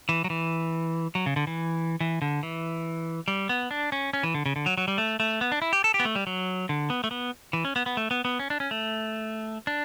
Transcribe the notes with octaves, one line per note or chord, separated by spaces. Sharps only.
E3
F#3
E3
F#3
C#3
D3
E3
E3
D3
E3
G3
B3
D4
C#4
C#4
E3
D3
C#3
D3
F#3
F#3
G3
A3
A3
B3
D4
E4
G4
A4
G4
B3
A3
G3
F#3
D3
B3
A3
B3
E3
C#4
B3
B3
A3
B3
B3
C#4
D4
C#4
A3
D4